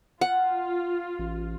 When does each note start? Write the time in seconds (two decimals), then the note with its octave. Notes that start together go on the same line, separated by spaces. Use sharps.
0.21 F4 F#5
1.19 A1